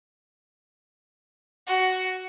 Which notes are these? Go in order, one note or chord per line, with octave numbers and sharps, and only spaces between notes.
F#4